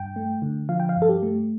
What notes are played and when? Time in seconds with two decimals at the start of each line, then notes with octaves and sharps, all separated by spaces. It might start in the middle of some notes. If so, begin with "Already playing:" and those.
Already playing: G2 G5
0.16 A3
0.42 D3
0.69 F3 F5
0.80 G5
0.89 F5
0.96 G2
1.02 A4
1.09 G4
1.23 A3